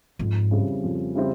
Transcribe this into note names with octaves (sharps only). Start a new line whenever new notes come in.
F2 G#2
C#3 G3 C4 E4
F2
C#3 G3 C4 E4